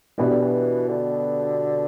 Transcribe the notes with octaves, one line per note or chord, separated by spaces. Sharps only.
B2 E3 B3 D4 G4
D3
E3
D3